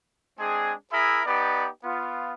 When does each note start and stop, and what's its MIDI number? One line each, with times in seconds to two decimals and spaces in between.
0.39 0.72 56
0.39 0.72 60
0.39 0.72 62
0.39 0.72 68
0.92 1.21 64
0.92 1.21 68
0.92 1.21 70
0.92 1.21 76
0.92 1.21 83
1.26 1.67 59
1.26 1.67 63
1.26 1.67 67
1.26 1.67 71
1.26 1.67 74
1.84 2.33 59
1.84 2.33 65